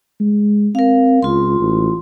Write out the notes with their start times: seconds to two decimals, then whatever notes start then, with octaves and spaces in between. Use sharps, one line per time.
0.20 G#3
0.75 C4 A#4 F5
1.22 C#2 F4 C6
1.60 A1